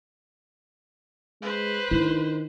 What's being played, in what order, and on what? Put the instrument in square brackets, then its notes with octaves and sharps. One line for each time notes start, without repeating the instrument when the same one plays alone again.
[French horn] G#3 [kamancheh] B4 C5
[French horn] D#3 [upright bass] D4 [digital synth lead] E4